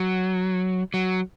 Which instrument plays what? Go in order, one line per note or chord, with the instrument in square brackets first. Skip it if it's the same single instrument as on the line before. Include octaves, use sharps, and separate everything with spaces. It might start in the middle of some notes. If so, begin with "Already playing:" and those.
Already playing: [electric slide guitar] F#3
F#3